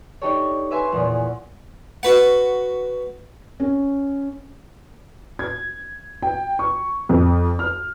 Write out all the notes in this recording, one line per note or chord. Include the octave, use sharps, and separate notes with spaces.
D4 D#4 G4 A4 C#5
B4 E5 G#5 C6
E2 A#2 C#3 F3
F#4 B4 F#5
C#4
G#6
G5
C#6
F2
F6